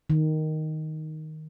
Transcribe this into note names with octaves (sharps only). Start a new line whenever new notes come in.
D#3